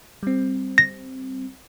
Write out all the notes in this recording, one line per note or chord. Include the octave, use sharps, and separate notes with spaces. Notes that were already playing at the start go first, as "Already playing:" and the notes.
G3 C4
A#6